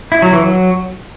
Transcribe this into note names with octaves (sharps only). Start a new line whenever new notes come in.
E4
F#3
E3
F#3